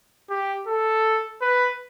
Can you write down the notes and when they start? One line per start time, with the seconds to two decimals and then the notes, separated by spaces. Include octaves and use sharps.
0.30 G4
0.67 A4
1.42 B4